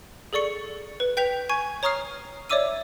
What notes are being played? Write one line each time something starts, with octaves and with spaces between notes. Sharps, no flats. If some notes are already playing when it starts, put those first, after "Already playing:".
G#4 A4 D5 C#6 C#7
B4
B4 G5 G6 B6 F7
G#5 C#6 G#6
C#5 A#5 C#6 D#6 F6 C7
C#5 D5 E5 D6 E6 D#7